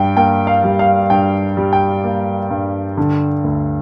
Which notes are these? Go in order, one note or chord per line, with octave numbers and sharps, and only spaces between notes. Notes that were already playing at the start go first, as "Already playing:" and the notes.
Already playing: G2 G3 G5
A#3 G5
F5
G3
F5
G2 G5
G3
G5
A#3
G2
D3
D2